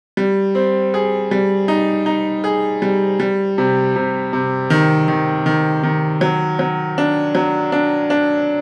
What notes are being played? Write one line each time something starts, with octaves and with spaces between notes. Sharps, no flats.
G3
C4
G#4
G3
D#4
D#4
G#4
G3
G3
C3
C3
C3
D#3
D#3
D#3
D#3
F#3
F#3
D4
F#3
D4
D4